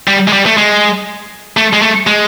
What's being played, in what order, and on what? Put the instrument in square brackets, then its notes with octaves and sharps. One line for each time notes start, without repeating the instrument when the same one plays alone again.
[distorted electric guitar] G3
G#3
G3
A3
G#3
A3
G#3
A3
G#3